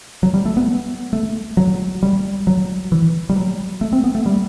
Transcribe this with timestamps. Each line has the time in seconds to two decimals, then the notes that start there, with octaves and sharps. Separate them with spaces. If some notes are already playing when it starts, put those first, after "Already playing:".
0.23 F#3
0.34 G3
0.45 A3
0.57 B3
1.13 A3
1.57 F#3
2.03 G3
2.47 F#3
2.92 E3
3.29 G3
3.36 F#3
3.81 A3
3.93 C4
4.04 B3
4.15 A3
4.26 G3